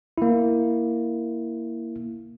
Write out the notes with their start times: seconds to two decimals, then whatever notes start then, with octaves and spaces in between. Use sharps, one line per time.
0.18 A#3 E4